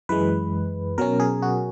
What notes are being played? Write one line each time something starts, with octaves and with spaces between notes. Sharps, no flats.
F#2 E3 G#3 B4
B2 F#3 C#4 A#4
G#4
F#4